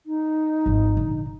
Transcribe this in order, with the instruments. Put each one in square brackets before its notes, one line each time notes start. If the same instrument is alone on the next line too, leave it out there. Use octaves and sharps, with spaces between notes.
[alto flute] D#4
[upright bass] G#1 F3
A#2 D3